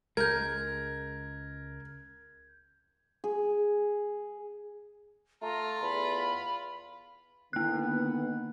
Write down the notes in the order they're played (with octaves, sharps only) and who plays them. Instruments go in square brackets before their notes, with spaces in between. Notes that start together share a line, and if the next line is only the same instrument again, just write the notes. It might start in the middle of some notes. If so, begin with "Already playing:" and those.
[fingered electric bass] C#2 G#3 [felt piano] A#4 [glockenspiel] G6 G#6
[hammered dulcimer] G#4
[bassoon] A3 [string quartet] F4 [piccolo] A#5
[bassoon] E2 [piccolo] B5
[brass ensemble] D3 D#3 B3 [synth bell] A#3 F#6